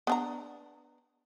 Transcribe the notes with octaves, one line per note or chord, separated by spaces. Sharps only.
B3 D4 A#5